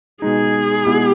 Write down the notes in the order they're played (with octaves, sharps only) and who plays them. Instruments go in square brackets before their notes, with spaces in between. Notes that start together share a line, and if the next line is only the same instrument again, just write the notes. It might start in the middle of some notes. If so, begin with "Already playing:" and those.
[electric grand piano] B2 G#3 D#4 [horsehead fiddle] G#4
[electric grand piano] B2 G#3 B3 E4